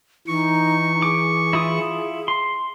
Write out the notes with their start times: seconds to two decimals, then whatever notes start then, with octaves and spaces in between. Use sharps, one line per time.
0.28 E3 D#4 C#6
1.02 G#4 D6
1.53 E4 F4 D#6
2.28 C6